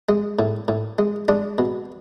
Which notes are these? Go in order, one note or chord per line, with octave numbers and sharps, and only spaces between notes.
G#3
A2
A2
G#3
G#3 D4
B2